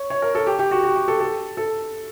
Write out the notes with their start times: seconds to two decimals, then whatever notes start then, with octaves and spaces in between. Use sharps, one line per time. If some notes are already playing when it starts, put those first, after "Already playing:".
Already playing: C#5
0.10 C#5
0.22 A#4
0.35 A4
0.47 G4
0.59 G4
0.71 F#4
0.84 F#4
0.96 G4
1.08 A4
1.20 A4
1.57 A4